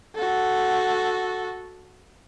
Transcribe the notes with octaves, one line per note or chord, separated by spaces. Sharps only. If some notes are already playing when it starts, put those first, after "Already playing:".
F#4 A4